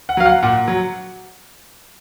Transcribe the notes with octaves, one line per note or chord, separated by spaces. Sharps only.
F#5
F#3 F5
F#5
A#2 F#5
F#3